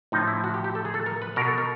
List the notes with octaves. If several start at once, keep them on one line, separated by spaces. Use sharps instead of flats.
A2 F3 D#4
E4
F#4
G4
G4
A4
G#4
A4
A#4
B4
B2 A#4
A4
A#4